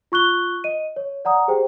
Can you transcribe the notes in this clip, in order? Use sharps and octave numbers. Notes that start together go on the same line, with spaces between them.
F4 C#6 F#6 G7
D#5 D#7
C#5
D5 F#5 A#5 D#6
G4 G#4 C5 G5